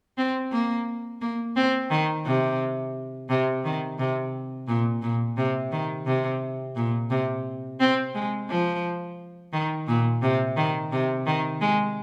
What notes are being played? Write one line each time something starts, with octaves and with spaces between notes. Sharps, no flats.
C4
A#3
A#3
C4
D#3
C3
C3
D#3
C3
A#2
A#2
C3
D#3
C3
A#2
C3
C4
G#3
F3
D#3
A#2
C3
D#3
C3
D#3
G#3